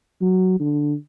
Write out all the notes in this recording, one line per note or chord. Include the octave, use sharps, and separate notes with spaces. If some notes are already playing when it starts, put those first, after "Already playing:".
F#3
D3